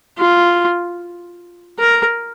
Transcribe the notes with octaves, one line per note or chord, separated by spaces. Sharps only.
F4
A#4